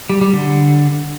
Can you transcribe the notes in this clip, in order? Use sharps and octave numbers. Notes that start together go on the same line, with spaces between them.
G3
G3
D3